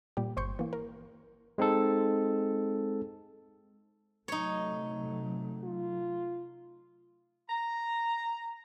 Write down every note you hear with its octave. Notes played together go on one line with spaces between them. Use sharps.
A#2 G3 G4
G1 C5 C6 C#6 G6
E3 A#3
A#4
G#3 C4 D#4 A4
C3 F#3 A3 D#4 C#5
F4
A#5